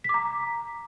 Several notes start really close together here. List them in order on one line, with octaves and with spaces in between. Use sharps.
B6 D6 A#5